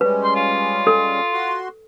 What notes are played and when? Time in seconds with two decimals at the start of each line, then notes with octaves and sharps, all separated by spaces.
0.01 G3 G#3 C#4 B4
0.24 C6
0.36 F4
0.87 A4
1.33 F#4 C6